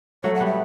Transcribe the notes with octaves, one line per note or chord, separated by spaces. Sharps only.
F#3 A3 C#5
F#5
G3 B3
E5